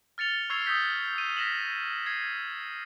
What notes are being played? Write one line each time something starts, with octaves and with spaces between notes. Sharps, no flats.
F6 A6 C#7 F7 G7
C#6 E6 F6 G#6 C7 F7
D#6 E6 G6 B6
G6 D#7
F6 A#6 B6 E7 F#7
G#6 C7